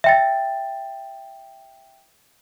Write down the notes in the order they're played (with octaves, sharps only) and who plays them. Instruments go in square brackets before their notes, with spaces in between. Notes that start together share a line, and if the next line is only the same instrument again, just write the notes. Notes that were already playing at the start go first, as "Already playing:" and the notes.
[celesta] E5 G5 A6